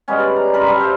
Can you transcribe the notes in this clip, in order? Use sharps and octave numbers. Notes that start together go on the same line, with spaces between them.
G3 G#3 B3 C#4
D5
A#5
F#2 F4 A#4 B5
G3 A4 D5 F5
C5 E5 F5